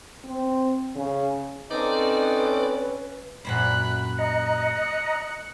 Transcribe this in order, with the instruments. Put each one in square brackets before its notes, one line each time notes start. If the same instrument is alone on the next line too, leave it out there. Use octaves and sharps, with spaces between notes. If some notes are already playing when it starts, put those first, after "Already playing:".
[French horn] C4
C#3
[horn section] C4 D#4 A4 [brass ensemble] C#4 [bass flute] B4 [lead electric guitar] D5
[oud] F#2 A#2 C5 [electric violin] B5 F#6
[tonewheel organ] D#5 A#5 [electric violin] F#6 C#7